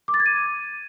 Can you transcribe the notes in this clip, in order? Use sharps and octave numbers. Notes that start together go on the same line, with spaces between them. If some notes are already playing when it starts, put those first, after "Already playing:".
D6
A6
G#6
D#7